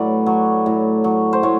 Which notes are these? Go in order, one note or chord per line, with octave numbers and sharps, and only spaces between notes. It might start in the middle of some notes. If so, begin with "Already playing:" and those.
Already playing: A2 F#3 B4 D5
F#3
A2
F#3
C5
A2 C#5